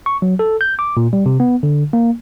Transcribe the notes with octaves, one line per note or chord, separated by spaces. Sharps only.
C#6
F#3
A4
G6
D6
A#2
G3
C3
B3
D3
A#3